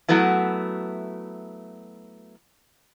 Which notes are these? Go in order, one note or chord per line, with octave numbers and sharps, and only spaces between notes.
F#3 A3 B3 E4